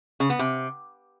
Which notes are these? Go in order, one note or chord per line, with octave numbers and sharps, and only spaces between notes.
C#3
B3
C3